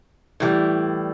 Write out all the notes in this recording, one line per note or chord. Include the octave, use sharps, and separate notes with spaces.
A2 E3 G3